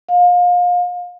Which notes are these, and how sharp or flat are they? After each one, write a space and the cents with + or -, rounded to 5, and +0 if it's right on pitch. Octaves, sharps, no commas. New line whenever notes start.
F5 +30